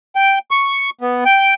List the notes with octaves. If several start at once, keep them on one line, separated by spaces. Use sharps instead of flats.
G5
C#6
B3
G5